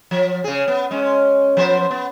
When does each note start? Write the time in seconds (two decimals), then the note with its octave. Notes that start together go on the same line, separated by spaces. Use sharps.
0.11 F3
0.44 C#3 G#4
0.68 B3
0.91 G#3 C#4
1.57 F3 B3 C5
1.91 B3